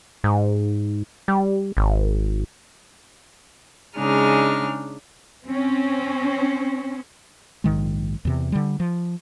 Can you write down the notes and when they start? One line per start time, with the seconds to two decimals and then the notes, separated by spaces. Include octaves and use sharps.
0.24 G#2
1.28 G3
1.77 G#1
3.96 C#3 G#3 D4 D#4 F6
5.46 C4 C#4
7.64 A#1 G#2 D#3 G#3
8.25 E2 C3
8.52 D3 G3
8.80 F3